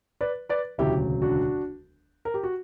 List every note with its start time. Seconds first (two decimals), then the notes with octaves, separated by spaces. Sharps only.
0.21 B4 D5
0.49 B4 D5
0.78 E1 D2 C#3 F#3 E4 G4
1.22 D4 F#4
2.25 A#4
2.34 G4
2.43 F#4